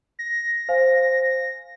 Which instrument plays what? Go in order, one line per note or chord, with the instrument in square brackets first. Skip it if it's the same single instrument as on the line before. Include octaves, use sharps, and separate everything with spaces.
[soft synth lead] A#6
[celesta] C5 F5 G#5